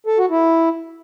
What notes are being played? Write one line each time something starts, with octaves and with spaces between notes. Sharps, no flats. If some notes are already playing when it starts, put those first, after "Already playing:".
A4
F#4
E4